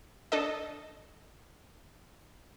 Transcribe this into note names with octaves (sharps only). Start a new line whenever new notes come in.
D4 A4 D#5